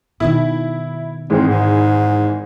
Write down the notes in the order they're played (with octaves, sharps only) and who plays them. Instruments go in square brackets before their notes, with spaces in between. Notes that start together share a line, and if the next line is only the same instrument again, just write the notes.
[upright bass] B2 D#3 [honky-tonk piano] E4
[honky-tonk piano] G#1 E3 G#3 [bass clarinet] C4
[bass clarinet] G#2